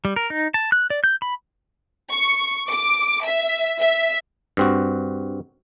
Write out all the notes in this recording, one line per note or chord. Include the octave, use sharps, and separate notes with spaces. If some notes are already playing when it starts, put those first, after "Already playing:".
G3
A#4
D#4
A5
F#6
D5
G6
B5
C#6
D6
E5
E5
G2 C4 F#4